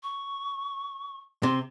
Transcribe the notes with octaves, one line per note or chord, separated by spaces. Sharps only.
C#6
C3 C6